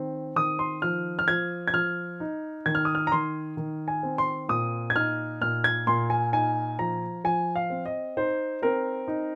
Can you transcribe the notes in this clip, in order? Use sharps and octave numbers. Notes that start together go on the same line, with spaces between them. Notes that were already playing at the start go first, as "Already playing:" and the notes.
Already playing: D#3 C4
D#3 D#6
C6
F3 F6
F6
F3 G#6
G#6
F3 F6
D#4
D#3 G#6
F6
D#6
F6
A#5
D#3 C6
D#3
G#5
C4
C6
A#2 D#6
G#6
D#4 F6
A#2 F6
G#6
A#2 C6
G#5
D#4 G#5
F3 A#5
F3 G#5
F5
C4
D#5
D#4 C5
C4 A#4
D#4